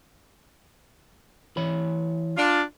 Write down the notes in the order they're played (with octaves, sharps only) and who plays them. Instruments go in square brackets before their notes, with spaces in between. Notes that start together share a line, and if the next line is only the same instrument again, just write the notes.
[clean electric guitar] E3 C#5 B5
[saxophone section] D4 F4